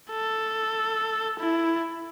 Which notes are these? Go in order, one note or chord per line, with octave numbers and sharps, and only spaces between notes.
A4
E4